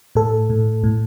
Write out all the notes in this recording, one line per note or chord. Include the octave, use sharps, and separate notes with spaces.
A2 A4
A2
A2